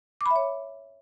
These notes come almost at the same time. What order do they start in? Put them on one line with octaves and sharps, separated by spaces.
D6 B5 E5 C#5